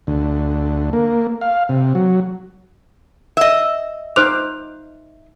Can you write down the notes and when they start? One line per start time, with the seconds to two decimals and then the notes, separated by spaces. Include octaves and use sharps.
0.07 D2
0.93 A#3
1.41 F5
1.69 C3
1.95 F#3
3.37 D#5 E5
4.16 D#4 C5 D6 F6 F#6 F7